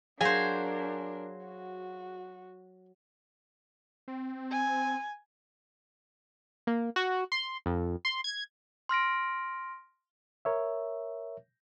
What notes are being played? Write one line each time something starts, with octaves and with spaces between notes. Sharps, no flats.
F#3 D4 G#4 A#4 C5 F5 G#5
F#4
C4
G#5
A#3
F#4
C6
F2
C6
G#6
C6 F6 A#6 D7
A#4 C#5 E5